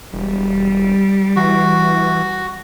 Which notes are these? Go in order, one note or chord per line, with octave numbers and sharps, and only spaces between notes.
E1 G3
E3 F#4